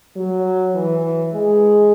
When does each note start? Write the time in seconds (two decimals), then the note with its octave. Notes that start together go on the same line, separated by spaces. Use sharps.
0.16 F#3
0.75 E3
1.33 G#3